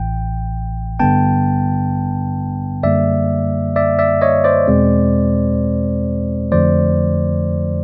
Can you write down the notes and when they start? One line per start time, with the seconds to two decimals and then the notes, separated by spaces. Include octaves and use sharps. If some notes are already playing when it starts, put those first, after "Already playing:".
Already playing: A1 A2 E3 G5
1.00 G2 D3 G3 B3 G5 A5
2.83 F#2 D3 G3 A#3 D5 E5
3.76 D5 E5
3.99 D5 E5
4.21 C#5 D#5
4.44 C5 D5
4.68 E2 B2 G#3 C4
6.52 F2 D3 F3 A3 C5 D5